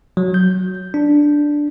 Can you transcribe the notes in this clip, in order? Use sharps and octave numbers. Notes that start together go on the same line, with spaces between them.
F#3
G6
D4